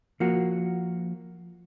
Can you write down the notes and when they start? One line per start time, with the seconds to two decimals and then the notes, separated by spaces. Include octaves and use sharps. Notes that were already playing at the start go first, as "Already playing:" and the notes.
0.20 F3 A#3 F#4